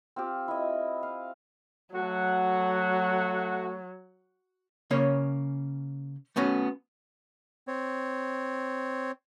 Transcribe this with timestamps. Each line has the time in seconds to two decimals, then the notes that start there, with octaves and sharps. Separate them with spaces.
0.16 C4 F4 G4
0.48 E4 D#5
1.03 F5
1.95 F#3 A3 F#4 F#5
4.91 C#3 A#3 C#4 C#5
6.36 A3 B3 C#4 F#4
7.68 C4 C#5